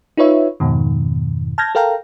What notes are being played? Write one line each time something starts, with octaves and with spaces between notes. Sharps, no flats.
D#4 F4 B4 C#5 E5
F2 G#2 B2 D#3
A5 F6 G6 G#6 A#6
A4 A#4 F5 G5 A#5